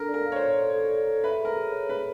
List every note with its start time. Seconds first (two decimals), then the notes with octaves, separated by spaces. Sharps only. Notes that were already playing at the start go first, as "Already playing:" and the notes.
Already playing: D4 A4 A#4
0.09 D5
0.14 A#4
0.26 F5
0.32 C#5
0.36 C5
0.42 D5
0.58 A4
0.75 A4
0.90 D5
1.07 A4
1.24 B4 E5
1.40 G#4 A#4
1.57 G#4
1.72 C#5
1.89 G#4 B4